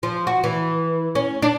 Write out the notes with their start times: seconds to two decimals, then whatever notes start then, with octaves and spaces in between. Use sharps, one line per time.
0.03 F3
0.27 F#4
0.44 E3
1.15 C#4
1.42 D4